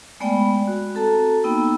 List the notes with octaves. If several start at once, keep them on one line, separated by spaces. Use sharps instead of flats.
G#3 A3 B3 D5 G5 B5
F#4
C4 F#4 A4 A5 A#5
A#3 B3 D#4 G5 B5 E6